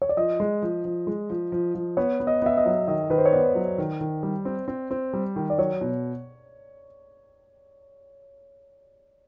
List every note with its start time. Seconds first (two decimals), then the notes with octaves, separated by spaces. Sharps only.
0.02 C#5
0.09 D5
0.17 F3 D#5
0.40 G#3
0.62 F3
0.85 F3
1.07 G#3
1.30 F3
1.52 F3
1.75 F3
1.97 B3 C#5
2.20 B3
2.27 D#5
2.42 B3 E5
2.57 D#5
2.65 F#3
2.88 D#3 D#5
3.10 D#3 B4
3.18 C5
3.26 C#5
3.32 B3 D5
3.55 F#3
3.78 D#3
4.01 D#3
4.23 G3
4.45 C4
4.68 C4
4.91 C4
5.13 G3
5.36 D#3
5.50 D5
5.58 F#3 C#5
5.81 B2